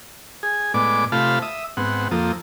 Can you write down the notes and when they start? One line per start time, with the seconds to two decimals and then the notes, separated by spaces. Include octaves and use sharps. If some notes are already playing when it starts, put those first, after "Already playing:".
0.43 G#4
0.74 A2 G#3 B3 D5 D6
1.12 C3 A3 F4 F5 A5 B5
1.42 E5 D#6
1.77 G#2 B3 C4 F#5
2.11 F2 F3 A#3 A4 D#6